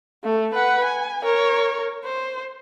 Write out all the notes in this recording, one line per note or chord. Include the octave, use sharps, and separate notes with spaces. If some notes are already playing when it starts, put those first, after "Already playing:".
A3
B4 F#5
G#5
A#4 C#5
C5